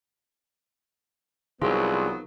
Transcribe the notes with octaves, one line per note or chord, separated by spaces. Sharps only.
C2 D#3 F3 F#3 B3 G#4 F5 C6